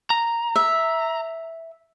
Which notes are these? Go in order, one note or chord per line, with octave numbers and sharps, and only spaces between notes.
A#5
E5